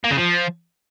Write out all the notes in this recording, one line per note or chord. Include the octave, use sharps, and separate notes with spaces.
A#3
C#3
F3